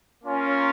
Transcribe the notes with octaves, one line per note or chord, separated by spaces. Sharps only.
A#3 C#4 F4